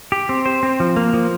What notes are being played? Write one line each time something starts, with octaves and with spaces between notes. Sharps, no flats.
G4
C4
C5
C4
F3
A#3
F3